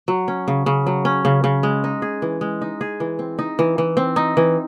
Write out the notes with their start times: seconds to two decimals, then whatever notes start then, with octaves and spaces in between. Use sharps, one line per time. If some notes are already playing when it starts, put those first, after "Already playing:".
0.08 F#3
0.28 C#4
0.48 C#3
0.66 C#3
0.87 F#3
1.05 C#4
1.25 C#3
1.44 C#3
1.63 G#3
1.84 D#4
2.02 G#4
2.22 E3
2.41 G#3
2.62 D#4
2.81 G#4
3.00 E3
3.19 C4
3.39 D#4
3.59 E3
3.78 E3
3.97 C4
4.16 D#4
4.37 E3